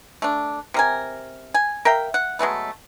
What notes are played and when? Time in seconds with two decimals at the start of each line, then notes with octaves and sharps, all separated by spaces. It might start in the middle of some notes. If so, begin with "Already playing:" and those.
0.22 A3 D4
0.74 C3 A#4 G#5
1.54 G#5
1.85 A#4 E5 F5 G5
2.14 F#5
2.39 F#3 G#3 A3 B3